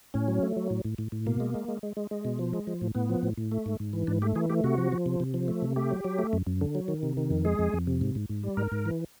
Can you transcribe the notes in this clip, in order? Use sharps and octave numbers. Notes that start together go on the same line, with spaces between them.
A2 C#4
F#3
A3
F#3
A2
A2
A2
A2
B2 A#3
G#3
G#3
G#3
G#3
G#3
G#3
B2
F3
G#3
F3
A2
A2 B3
F3
A2
A2
A3
G#2
G#2
E3
G#2 D4
A3 G4
E3 G#4
A3 G4
C3 F#4
F3
F3
C3
C3
F3
A3
C3
A3 G4
F#3
F#3
A3
F#2
F#2
D3
F#3
D#3
C3
D#3
F2
G#3 G#4
F2
F2
C3
G#2
G#2
G#2
G3
G#2 A#4
G#2
E3